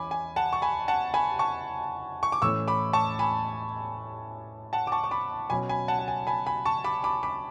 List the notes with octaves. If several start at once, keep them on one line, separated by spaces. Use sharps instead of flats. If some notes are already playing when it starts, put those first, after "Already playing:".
Already playing: E3 C#4 G#5 B5 D6
G#5
F#5 A5
C#6
G#5 B5
F#5 A5
G#5 B5
A5 C#6
C#6
D6
A2 E3 A3 C#4 C#6 E6
B5 D6
A5 C#6
G#5 B5
F#5 A5
D6
A5 C#6
C#6
B5 D6
B2 F#3 C#4 G#5 B5
G#5 B5
F#5 A5
F#5
G#5
G#5 B5
G#5 B5
A5 C#6
B5 D6
B5 D6
B5 D6